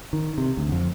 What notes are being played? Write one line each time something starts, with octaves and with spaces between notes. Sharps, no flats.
D#3
C3
D2
F2